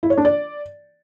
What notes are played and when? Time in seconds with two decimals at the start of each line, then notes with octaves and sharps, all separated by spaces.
0.03 E4
0.10 C#5
0.17 D4
0.25 D5